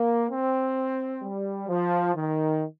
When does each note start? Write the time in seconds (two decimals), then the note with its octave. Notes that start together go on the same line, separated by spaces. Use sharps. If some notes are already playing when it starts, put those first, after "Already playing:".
Already playing: A#3
0.30 C4
1.22 G3
1.69 F3
2.15 D#3